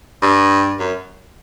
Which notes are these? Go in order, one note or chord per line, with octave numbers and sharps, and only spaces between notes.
G2
F#2